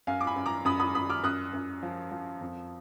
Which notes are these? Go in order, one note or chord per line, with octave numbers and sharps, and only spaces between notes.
F#2 F5 G#5
D6
G#5 B5
F#2
A#5 D6
F#2 B5 D#6
B5 D#6
F#2 B5 D#6
D6 F6
F#2 D#6 F#6
F#2
F3
F3
F2